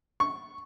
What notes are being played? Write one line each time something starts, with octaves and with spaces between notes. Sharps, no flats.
C#6